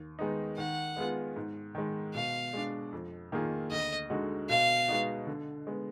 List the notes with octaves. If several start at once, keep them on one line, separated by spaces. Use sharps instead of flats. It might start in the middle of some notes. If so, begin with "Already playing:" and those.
Already playing: D#2
D#3 G#3 B3 D#4
D#3 F#5
G#3 B3 F4 G#4
G#2
D#3 G#3
B2 F5
G#3 D4
F2
D#3 A#3 F4 G#4
D2 D#5
D3 G#3 D#4 F#4
B2 F5
G#3 B3 D#4 F#4
D3
G#3 B3